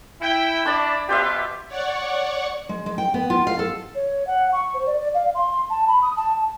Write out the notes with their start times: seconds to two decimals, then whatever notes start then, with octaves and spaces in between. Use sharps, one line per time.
0.21 E4 G5
0.65 D4 E4 D5 A5 C#6
1.09 B2 F4 G4 C5 E5
1.67 C#5 D5 F#5 C#6
2.69 G#3
2.86 G#3
2.98 G5
3.14 B3
3.30 F4
3.47 F5
3.59 A4
3.95 C#5
4.27 F#5
4.52 C#6
4.73 C5
4.86 D5
4.99 D5
5.14 F5
5.34 C6
5.70 A5
5.87 B5
6.02 D#6
6.16 A5